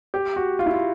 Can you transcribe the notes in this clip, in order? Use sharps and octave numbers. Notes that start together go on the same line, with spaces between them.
G4
F#4
F4
E4
F4